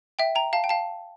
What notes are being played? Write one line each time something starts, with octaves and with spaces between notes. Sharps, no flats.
E5 G5
G5 A#5
F5 A5
G5
F5 A5